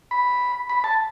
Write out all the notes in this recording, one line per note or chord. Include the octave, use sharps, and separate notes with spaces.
B5
B5
A5